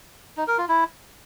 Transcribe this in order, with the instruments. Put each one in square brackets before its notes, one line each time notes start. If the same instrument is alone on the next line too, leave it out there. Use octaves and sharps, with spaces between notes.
[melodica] D#4
A#4
F4
E4